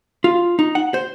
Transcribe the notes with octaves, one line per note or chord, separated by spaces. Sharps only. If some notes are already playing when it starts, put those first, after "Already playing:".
F4
D#4
F#5
C5